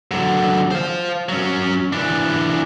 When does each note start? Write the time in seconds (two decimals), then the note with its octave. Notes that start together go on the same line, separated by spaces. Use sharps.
0.11 D3 F#3
0.71 C5 F5
1.29 F#3 C#4
1.93 E3 D4